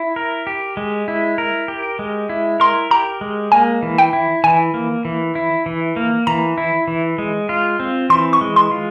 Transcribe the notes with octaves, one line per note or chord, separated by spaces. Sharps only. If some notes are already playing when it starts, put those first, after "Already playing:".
Already playing: E4
A#4
G4
G#3
E4
A#4
G4
G#3
E4
A#4 C6
G4 A#5
G#3
A#3 G#5
E3
G5
E4
E3 G#5
A#3
E3
E4
E3
A#3
E3 A#5
E4
E3
G#3
F4
C4
E3 C6
C#6
G#3
C6
F4